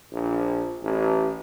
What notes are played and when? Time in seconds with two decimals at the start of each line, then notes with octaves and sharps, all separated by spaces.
0.12 A#1
0.83 A1